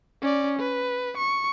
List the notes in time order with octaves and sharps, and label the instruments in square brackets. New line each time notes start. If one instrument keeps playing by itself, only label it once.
[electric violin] C#4 D5
B4
C#6